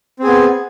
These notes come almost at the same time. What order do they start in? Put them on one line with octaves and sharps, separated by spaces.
C4 G#4 B3